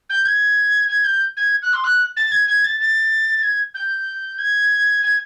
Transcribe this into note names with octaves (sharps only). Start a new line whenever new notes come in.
G6
G#6
G#6
G6
G#6
F#6
C6
F#6
A6
G#6
G#6
A6
A6
G#6
G6
G#6
G#6